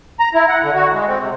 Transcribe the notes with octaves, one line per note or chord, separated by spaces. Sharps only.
A#5
E4
F#5
D3
F#4
G#3
C4
C3